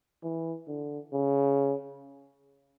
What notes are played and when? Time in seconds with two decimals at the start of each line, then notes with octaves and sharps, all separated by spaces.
0.24 E3
0.67 D3
1.13 C#3